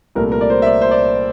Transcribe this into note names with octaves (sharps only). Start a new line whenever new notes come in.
C2 A#2 A3 A#4
A#4
D5
C5
E5
D5
C5
D5